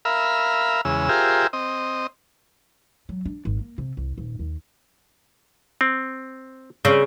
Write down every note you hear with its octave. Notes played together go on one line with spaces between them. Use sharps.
A#4 E5 F5 B5
E2 C#3 G#3 E6
F4 G4 G#4 A#4 C5 E5
C4 D#5
F#3
D4
G#1
A#3
C3
C2
D#1
D#2
C4
C#3 C4